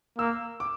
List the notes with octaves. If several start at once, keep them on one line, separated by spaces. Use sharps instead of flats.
A#3 E6
D6